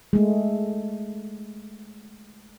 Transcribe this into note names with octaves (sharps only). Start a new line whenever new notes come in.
G#3 A3